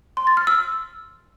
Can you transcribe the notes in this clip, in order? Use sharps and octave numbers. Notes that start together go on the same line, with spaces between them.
C6
A6
F6
E6